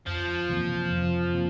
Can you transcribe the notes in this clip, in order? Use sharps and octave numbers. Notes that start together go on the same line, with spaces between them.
F2 F3
C3 E3 A#3
F2
C3 A#3